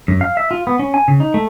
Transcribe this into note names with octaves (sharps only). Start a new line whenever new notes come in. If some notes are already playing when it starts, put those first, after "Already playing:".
F#2
F5
E5
F4
B3
C#4
G#5
C#3
D#4
A3